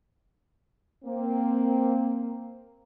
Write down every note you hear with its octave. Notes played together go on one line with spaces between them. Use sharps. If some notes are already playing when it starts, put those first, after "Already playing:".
A#3 C4